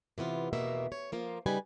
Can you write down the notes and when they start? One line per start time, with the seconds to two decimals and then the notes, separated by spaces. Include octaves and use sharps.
0.18 C3 E3 B3 F4
0.53 E2 B2 D#3 A#3 E5
0.92 C#5
1.12 F3 A#3 F4
1.46 C#3 G3 D#4 B4 G#5